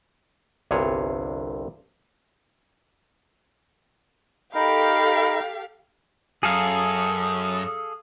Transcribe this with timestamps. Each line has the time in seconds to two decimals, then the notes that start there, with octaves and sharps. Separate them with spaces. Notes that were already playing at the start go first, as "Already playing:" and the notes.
0.71 G1 C2 G2 C3 G#4 C#5
4.55 D#4 G4 A4 A#4 F5 B5
6.43 F#2 G#4 A4 F5 D#6